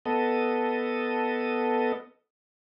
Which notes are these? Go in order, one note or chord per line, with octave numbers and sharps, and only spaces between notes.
B3 A4 D#5